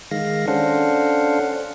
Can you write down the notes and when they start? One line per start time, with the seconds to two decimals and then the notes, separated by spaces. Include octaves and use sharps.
0.11 D#3 G#3 F5 A#6
0.48 C#4 D4 A4 C5 F5 F#5